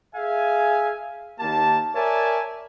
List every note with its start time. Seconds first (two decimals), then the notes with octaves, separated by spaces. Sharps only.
0.15 G#4 E5 F5 G#5
1.40 D#2 A#3 G4 A5
1.95 A#4 C#5 D5 E5 G#5 A5